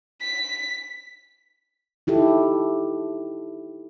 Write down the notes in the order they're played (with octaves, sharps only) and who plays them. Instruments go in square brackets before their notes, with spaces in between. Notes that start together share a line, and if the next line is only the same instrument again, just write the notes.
[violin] B6
[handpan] D#4 E4 G4 A4